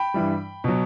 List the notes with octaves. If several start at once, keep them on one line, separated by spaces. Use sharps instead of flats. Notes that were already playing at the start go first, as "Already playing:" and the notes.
Already playing: G5 B5
G2 E3 G3
B2 F#3